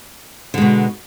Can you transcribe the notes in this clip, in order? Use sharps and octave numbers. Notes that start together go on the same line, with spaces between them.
B2 D3 G#3